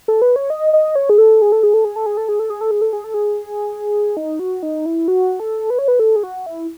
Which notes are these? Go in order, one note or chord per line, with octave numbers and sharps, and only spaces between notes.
A4
B4
C#5
D#5
D#5
C#5
G#4
A4
G#4
A4
G#4
A4
G#4
A4
G#4
A4
G#4
A4
G#4
A4
G#4
A4
G#4
A4
G#4
D#4
F#4
D#4
E4
F#4
A4
B4
C#5
B4
A4
G#4
F#4
E4